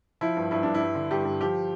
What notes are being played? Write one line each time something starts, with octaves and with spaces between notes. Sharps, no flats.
F3 E4
G2
G2 E4
G2 D4
E4
G2
D3
G2 G4
G2
F3 G4